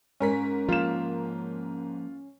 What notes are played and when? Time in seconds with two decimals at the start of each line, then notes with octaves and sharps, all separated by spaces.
0.20 G#2 C#4 A#4 B6
0.68 F3 A#3 F4 E7